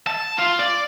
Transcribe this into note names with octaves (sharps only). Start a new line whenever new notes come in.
A5
F4
D5